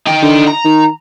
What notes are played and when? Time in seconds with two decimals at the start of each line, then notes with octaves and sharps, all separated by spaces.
0.07 D#4 G5
0.23 D3
0.47 A#5
0.65 D#3